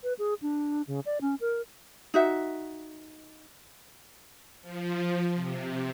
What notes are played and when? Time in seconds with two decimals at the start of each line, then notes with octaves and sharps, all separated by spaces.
0.03 B4
0.19 G#4
0.42 D4
0.87 C#3
1.06 D5
1.21 C#4
1.41 A#4
2.14 D#4 F#4 E5
4.62 F3
5.35 C3